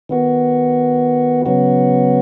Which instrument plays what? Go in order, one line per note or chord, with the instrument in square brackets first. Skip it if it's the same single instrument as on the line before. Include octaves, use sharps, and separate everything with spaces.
[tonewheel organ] D#3 B3 F#4
C#3 F#3 B3 F#4